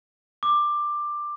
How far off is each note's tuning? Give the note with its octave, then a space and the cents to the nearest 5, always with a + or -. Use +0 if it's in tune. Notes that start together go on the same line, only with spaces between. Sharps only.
D6 +15